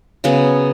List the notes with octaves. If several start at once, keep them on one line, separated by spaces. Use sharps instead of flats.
C#3 F#3 B3